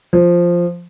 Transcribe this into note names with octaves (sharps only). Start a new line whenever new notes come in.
F3